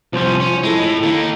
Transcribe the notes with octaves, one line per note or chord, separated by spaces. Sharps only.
C2 F3 C#4 C5
C#4
G#3 E4 A4
A2
D#3 A#3